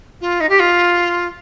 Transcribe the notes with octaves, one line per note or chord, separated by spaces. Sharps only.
F4
D#4
G4
F4